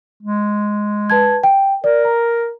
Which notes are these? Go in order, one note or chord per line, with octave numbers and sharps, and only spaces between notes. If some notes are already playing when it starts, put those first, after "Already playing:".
G#3
B4 A5 G#6
G5
A#4 D5
A#5